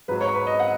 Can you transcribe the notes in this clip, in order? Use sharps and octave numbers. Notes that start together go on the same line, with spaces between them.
G#2 F#3 B4
C#5
B4
D#5
F#5